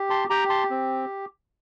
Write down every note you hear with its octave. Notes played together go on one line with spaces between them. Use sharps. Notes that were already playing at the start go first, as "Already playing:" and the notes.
Already playing: G4
A5 C6
G4 G5 A#5
A5 C6
C4